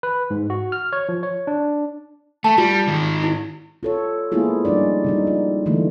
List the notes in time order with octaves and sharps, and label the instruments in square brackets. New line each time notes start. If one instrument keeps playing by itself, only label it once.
[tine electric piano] B4
G#2
F#4
F6
C#5
F3
C#5
D4
[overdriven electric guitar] A3 [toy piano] A5
[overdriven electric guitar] G3 [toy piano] F4
[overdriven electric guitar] G#2 D#3
[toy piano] E4
[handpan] F4 A4 C#5
G#3 A#3 B3 E4 F4 G#4
F3 G3 D4 D#4 D5
C#3 G3 D#4
F4
D3 E3 G3 A3 A#3